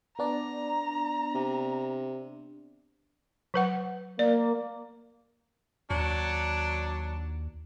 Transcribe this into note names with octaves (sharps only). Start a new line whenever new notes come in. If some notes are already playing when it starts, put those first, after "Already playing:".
B3 D4 D5 A#5
C3
F#3 B4 F#5
A#3 D5
D#2 F#3 D4